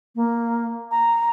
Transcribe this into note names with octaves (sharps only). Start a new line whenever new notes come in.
A#3
A#5